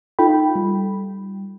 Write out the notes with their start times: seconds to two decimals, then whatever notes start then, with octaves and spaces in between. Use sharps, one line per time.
0.19 D#4 F4 A4 G5 B5
0.56 G3